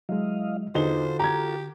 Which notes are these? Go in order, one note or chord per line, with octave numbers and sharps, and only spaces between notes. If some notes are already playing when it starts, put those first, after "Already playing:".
F#3 G#3 E4 D#5 F5
E2 D3 D#4 F4 F#4 A4 C5 G7
G4 A#5 G#6